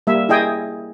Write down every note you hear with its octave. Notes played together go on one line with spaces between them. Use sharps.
G3 A#3 E5
E4 G#4 D#5 G5 G#5